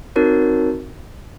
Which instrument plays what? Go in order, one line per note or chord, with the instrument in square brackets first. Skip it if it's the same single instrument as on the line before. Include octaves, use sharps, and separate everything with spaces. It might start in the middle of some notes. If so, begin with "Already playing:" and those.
[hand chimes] C4 D#4 F#4 A#4 C#5